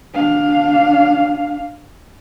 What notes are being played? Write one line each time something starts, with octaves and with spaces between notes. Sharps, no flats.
D4 F5